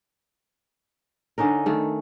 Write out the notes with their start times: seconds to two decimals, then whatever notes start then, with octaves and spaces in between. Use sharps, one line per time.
1.38 D3 C#4 D#4 A#4
1.66 D#3 A3